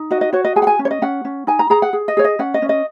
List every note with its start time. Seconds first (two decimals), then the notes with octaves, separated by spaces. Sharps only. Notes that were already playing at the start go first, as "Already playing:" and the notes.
Already playing: D#4
0.11 F#4 D#5
0.21 D#5
0.33 F#4 C#5
0.45 D#5
0.56 G#4 G#5
0.62 F#5
0.67 G#5
0.79 C#4
0.85 C#5
0.91 D#5
1.02 C#4 F#5
1.25 C#4
1.47 D#4 G#5
1.59 A#5
1.70 G#4 A#5
1.82 F#5
1.93 G#4
2.08 D#5
2.17 G#4 C#5
2.24 D#5
2.39 C#4 F#5
2.54 D#5
2.62 C#4
2.69 D#5